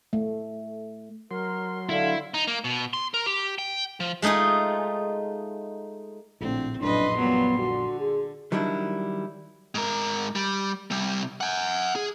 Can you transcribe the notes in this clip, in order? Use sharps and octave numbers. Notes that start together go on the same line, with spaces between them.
A3
F#3 A#4 C6
D3 E4 F5
D#4
A#3
B2
C6
A#4
G4
G5
F3
G#3 A3 D#4 F4 G#4
A#1 A2 D3 C4
A#1 F#2 A2 D4 B4 D#5 C6
A#2 F#3 G3 B3
D3 F#4
G#4
D#3 F#3 G3 D4 E4
G#2 A#4
G3
C3 G3
F#5 G#5
G#4